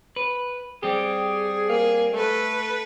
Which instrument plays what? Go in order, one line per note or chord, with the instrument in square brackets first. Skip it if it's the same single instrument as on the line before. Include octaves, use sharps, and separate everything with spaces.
[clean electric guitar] B4
[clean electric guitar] G3 C4 G4 [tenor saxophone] G#4
[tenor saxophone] A#3 [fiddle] G#4
[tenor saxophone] A3 [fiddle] A4 B4